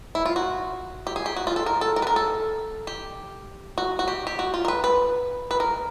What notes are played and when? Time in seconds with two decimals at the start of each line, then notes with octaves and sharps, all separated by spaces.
0.15 E4
0.26 F4
0.36 F#4
1.07 G4
1.16 G#4
1.26 G4
1.36 F#4
1.47 F4
1.56 A4
1.66 A#4
1.81 A4
1.96 A#4
2.02 B4
2.07 A#4
2.16 A4
2.87 G4
3.78 F#4
3.99 F#4
4.08 G4
4.27 G4
4.39 F#4
4.54 F4
4.65 A#4
4.68 B4
4.84 B4
5.51 B4
5.60 A#4